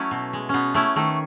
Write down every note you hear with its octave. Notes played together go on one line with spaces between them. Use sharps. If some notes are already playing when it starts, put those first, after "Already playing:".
Already playing: F#3 A3 C#4 E4 F#4
B2
G#3
B2 B3 C#4
A3 C#4 E4
D#3 A3